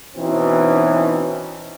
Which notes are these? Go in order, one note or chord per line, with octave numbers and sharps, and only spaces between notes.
B2 E3 C4 C#4 D#4